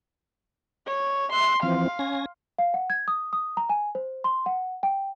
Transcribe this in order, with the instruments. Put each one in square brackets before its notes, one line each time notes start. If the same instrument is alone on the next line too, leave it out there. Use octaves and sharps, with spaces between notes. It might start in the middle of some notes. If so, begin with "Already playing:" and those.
[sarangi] C#5
[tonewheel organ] E5 F#6 [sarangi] C6
[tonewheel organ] E3 F3 C4 [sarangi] F5
[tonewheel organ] C#4 G#5 A#6
[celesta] F5
F#5
G#6
D#6
D#6
A#5
G#5
C5
C6
F#5
G5